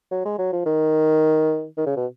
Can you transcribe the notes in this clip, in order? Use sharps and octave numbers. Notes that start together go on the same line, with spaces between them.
F#3
G#3
F#3
F3
D#3
D#3
C#3
B2